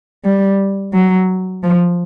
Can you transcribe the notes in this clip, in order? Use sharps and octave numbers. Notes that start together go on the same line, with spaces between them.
G3
F#3
F3